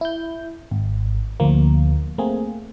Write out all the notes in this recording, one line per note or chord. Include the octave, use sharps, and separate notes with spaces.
E4 G6
G#1
D2 F3 A#3
A3 A#3 C4 G#4